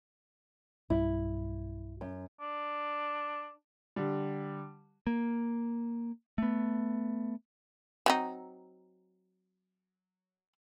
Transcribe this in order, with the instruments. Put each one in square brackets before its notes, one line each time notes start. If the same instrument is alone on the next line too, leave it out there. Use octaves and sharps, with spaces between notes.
[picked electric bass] B1 G2 G3 [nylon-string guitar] E4
[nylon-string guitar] F#2
[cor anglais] D4
[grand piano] D3 G3
[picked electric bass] A#3
A3 B3
[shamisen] F#3 C4 D#4